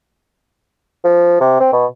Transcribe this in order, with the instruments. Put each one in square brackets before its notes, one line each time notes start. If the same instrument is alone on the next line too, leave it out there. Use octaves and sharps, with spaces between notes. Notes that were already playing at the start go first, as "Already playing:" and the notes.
[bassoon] F3
C3
C4
B2